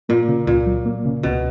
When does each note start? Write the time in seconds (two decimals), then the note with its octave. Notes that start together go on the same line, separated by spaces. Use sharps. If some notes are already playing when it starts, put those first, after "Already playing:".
0.09 A#2 A#3
0.29 C#3
0.47 C#2 A#2
0.66 F#3
0.86 A#3
1.05 C#3
1.23 C#2 B2